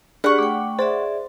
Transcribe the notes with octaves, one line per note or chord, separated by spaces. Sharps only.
D4 G4 G#4 D5 F#5 C#6
A3 G5 D6
G#4 C5 D5 E5 C6